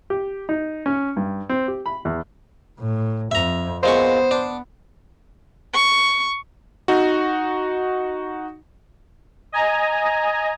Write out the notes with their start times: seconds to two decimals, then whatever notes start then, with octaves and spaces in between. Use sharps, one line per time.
0.10 G4
0.49 D#4
0.86 C#4
1.17 G2
1.49 C4
1.68 G4
1.86 B5
2.05 E2
2.79 A2
3.31 F2 E5 A#5
3.83 A#2 G#3 B3 C5 C#6
4.31 D4
5.74 C#6
6.88 D#4 F#4
9.52 D#5 G#5 A#5